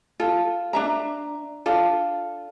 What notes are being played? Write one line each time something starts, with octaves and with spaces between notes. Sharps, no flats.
F4 A4
D4 E5 A#5
D4 F4 A4